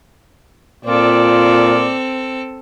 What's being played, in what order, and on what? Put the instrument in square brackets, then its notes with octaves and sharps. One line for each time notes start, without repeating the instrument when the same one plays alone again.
[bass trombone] A#2 [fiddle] C4 A4 [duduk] F4 [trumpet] D5